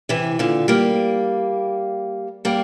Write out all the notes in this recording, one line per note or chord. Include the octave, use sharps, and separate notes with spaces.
C3 E3
A#2 D3
G3 A#3
G3 A#3